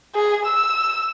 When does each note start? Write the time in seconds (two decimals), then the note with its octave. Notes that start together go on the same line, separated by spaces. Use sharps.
0.15 G#4
0.46 E6